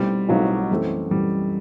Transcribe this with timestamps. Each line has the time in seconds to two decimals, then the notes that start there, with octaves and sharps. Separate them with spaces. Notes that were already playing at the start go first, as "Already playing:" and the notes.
Already playing: B1 B2 G3 A3 C4 E4
0.29 B1 B2 F#3 A3 C4 E4
0.71 F#2 E3 A3 C4
1.11 F#2 E3 G3 A3 C4